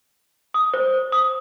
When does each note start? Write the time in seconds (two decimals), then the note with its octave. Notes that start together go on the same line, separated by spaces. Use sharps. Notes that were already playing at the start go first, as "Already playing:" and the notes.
0.54 D#6
0.74 C5
1.12 D#6